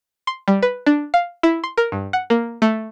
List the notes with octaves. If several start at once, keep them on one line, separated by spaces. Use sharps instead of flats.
C6
G3
B4
D4
F5
E4
C6
A#4
G2
F#5
A#3
A3